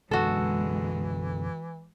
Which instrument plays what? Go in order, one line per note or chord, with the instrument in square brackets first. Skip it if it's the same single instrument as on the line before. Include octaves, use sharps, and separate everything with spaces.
[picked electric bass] F#2 B2 D3 [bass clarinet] E3 [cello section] G#3 [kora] F#4 A4